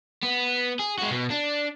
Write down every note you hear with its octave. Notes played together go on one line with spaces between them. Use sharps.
B3
G#4
G#3 F#4
B2
D4